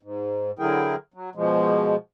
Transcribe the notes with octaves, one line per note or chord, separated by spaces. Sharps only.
G#2
D3 F#3 E4 G#4 A#4 G5
F#3
B2 F3 G#3